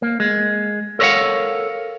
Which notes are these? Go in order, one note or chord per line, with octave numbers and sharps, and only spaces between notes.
A#3
G#3
A4 A#4 C#5 D5 F5 F#5